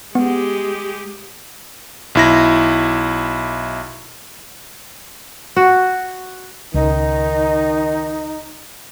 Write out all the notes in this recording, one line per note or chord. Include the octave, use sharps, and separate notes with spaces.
G#3 B3 G4
B1 E4 A#6
F#4
C#2 D#3 D#4